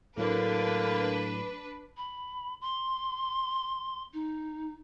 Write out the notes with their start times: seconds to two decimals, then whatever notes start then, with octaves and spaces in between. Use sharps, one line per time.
0.18 A2 D3 F#3 A3 A#3 D4 A4 B4
1.97 B5
2.61 C6
4.14 D#4